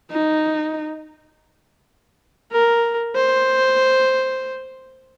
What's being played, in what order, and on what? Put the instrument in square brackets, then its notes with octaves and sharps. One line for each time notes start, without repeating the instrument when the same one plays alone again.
[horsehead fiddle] D#4
[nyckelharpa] A#4
C5